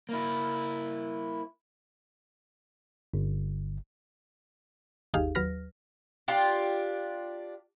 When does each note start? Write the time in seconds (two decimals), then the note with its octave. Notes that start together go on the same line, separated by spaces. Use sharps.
0.09 A#3 E4
3.14 G1
5.14 G1 D#2 D#4 G4 G#4 F5
5.35 D#2 F#3 B4 F6 A#6
6.28 D4 F4 G4